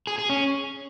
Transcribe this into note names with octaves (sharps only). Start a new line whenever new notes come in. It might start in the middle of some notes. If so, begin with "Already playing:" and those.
G#4
G#4
C#4